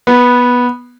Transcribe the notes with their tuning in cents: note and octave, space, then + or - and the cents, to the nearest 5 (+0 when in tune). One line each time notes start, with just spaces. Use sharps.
B3 -10